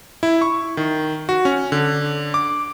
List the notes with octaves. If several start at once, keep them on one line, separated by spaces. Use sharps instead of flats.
E4
C#6
D#3
F#4
C#4
D3
D6